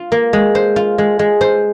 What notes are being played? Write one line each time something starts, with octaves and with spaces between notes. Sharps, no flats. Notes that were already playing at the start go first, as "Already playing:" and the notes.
Already playing: F4
A#3
G#3
C5
F4
G#3
G#3
C5